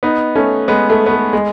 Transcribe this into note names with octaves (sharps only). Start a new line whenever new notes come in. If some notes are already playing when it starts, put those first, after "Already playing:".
B3 D#4
A3 C#4
G#3 B3
A3
B3
A3
G#3